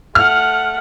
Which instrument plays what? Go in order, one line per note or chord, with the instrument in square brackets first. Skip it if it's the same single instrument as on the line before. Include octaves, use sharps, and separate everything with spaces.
[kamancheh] A3 F#5 [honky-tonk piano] F6